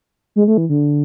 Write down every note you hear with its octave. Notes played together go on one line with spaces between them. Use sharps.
G#3
A3
E3
D3